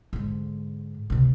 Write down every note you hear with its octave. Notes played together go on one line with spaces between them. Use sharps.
G#2 D3
C#2 C3